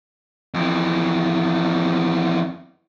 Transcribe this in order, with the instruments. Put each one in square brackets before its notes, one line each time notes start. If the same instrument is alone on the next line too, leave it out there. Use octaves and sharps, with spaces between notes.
[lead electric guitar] F2 E3